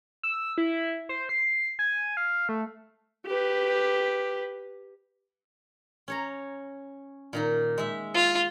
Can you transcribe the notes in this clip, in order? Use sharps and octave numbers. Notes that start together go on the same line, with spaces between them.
E6
E4
C5
C7
G#5
F5
A3
G4 B4
C#4 C#5 A#5
A#2 D#3 D#4
G#3 E5
F4